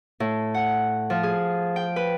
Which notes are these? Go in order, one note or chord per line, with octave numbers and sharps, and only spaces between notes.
A2
F#5
F3
G#4
G5
B4